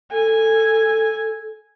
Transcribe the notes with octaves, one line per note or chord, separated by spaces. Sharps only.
A4 G#5